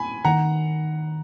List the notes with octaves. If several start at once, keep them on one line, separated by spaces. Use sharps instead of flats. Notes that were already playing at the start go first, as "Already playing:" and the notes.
Already playing: G#5 B5
D#3 F#5 A#5